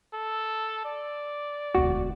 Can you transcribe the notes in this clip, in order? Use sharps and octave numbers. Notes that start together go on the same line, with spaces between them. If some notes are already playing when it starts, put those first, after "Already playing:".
A4
D5
E1 D2 F#4